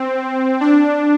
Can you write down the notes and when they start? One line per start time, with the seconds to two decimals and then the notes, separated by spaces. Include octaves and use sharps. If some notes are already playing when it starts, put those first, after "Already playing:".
Already playing: C4
0.61 D4